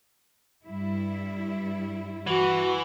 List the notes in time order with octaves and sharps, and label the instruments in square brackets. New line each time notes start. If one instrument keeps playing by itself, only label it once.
[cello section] G2 G3 E4
[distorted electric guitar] E3 [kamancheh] F#4